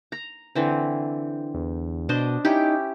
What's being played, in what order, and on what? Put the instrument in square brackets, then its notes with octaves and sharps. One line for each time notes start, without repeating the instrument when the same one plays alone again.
[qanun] A#5
D3 E3 C4
[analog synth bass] E2
[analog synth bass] B2 [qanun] D4 C5 D#5
[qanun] C#4 E4 G4 [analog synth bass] D#4